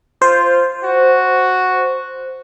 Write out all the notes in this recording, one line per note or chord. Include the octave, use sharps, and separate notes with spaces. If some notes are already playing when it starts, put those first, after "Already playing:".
F4 C5
F#4